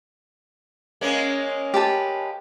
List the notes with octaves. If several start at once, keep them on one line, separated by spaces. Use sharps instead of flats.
G#3 A#3 C#4
G4 B4 A5